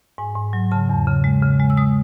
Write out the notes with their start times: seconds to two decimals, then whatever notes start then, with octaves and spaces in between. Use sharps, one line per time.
0.18 G#2 G#5
0.35 G#2
0.53 F#3
0.71 C#3 A5
0.89 E2
1.07 C#3
1.24 G#3
1.43 C#3
1.60 G#3
1.70 E6
1.77 G#3 D#6